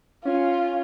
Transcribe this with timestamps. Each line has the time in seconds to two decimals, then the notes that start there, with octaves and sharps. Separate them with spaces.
0.25 C#4 F4